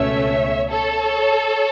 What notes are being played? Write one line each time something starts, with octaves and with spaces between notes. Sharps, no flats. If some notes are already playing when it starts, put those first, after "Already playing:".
Already playing: C#2 B2 A3 C#4 C#5 E5
A4 C#5